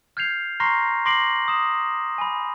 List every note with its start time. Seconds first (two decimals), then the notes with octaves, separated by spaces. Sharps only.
0.17 F6 G6 G#6 C7 F7
0.60 A#5 C6 C#6 F6 A#6 C7
1.05 C6 D6 A#6 C7 D7 F#7
1.48 D#6 E7
2.18 G#5 B5